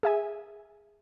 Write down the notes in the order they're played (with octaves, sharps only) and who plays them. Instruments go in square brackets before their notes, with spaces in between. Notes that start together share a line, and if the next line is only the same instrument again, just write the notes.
[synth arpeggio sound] G#4 E5 G#5